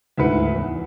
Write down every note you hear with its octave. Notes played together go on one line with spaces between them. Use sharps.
D2 G#2 E4 B4 C#7
E2